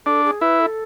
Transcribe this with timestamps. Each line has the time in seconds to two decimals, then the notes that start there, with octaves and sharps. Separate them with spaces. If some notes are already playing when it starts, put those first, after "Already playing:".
0.06 D4 A4
0.24 G#4
0.41 E4 B4
0.60 A4